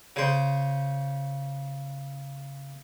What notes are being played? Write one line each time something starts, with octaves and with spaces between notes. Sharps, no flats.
C#3 C5